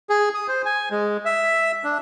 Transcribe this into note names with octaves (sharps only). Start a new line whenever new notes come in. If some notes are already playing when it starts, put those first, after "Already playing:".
G#4
D#6
C5
G#5
G#3
E5
D4